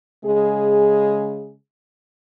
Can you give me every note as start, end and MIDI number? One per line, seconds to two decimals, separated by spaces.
0.25 1.55 49
0.25 1.55 56
0.25 1.55 68